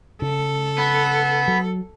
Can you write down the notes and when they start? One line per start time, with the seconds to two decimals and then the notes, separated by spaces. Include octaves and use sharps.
0.22 C#3 A4
0.78 B3
1.48 F#3